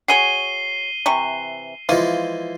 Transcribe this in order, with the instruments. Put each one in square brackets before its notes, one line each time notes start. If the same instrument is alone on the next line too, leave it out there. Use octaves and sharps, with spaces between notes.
[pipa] F#4 G#4 C#5 [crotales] C7 D#7 G7
[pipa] C3 E3 C#6
[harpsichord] E3 F3 G#3 [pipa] F4